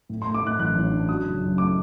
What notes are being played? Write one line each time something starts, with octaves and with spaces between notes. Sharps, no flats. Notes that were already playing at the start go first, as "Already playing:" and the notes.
A2
A3 C6
D6
A2 F#6
A1 F#6
A1
D4
F#3 D#6
F#1
F#2
A3 D6